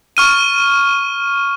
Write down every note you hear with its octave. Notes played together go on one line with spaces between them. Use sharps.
C#6 F6 D#7